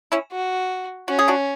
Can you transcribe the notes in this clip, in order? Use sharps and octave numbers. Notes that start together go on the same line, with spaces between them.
C#4 E4
F#4
C#4 F#4
G#4
D4 F#4